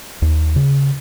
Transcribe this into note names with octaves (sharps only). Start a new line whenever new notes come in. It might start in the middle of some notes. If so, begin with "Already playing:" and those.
D#2
C#3